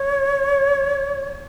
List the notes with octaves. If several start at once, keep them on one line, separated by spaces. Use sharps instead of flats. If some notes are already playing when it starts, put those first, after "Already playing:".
Already playing: C#5